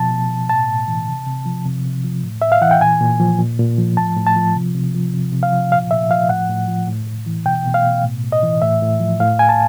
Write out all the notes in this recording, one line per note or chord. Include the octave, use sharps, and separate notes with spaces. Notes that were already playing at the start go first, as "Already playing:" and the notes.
Already playing: B2 F3 A5
B2
B2
A2 A5
A2
E3
C3
C3
F3
C3
C3
F3
A2
A2 E5
F5
E3 F#5
G5
A#2 G#5
A#2
F3
A#2
A#2
F3
A2 A5
A2
A5
F3
C3
C3
F3
C3
C3
F5
F3
A#2 F5
A#2 E5
F3 F5
A2 F#5
A2
F3
A2
A2
E3
B2 G5
B2
F5
B2
A2
A2
D#5
E3
A2 E5
A2
F3
A2 F5
A2 G#5
A5